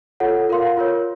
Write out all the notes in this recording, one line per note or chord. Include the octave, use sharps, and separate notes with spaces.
F4 A4 C#5 F#5
F4 A#4 F5 C6
F4 A#4 C#5